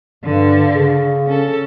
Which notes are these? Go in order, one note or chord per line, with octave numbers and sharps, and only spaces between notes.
G2 D3
C#3
C#4 A4